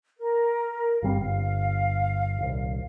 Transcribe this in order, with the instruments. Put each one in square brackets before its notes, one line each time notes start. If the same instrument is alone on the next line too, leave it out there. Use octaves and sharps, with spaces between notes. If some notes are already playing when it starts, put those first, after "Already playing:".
[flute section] A#4
[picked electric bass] G1 G3 C4 [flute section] F5
[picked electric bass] G1
D#1 C2